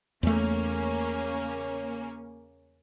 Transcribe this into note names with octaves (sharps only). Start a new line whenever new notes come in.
E2 C#3 A3 A#3 C#4